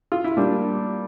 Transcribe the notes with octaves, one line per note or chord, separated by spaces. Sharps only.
F4
E4
A#2 G3 D4